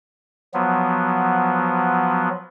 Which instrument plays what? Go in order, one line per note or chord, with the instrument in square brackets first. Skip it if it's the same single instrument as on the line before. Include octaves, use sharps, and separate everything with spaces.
[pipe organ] F3 F#3 B3